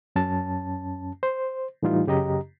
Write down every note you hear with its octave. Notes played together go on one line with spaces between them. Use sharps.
F#2 C#4 A5
C5
A2 E3 G3 D#4 F4
F#2 C#3 G4 D#5 A#5